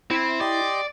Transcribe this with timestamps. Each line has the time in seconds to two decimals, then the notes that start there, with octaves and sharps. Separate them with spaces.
0.11 C4 E4
0.40 G4 D5 D#5 C6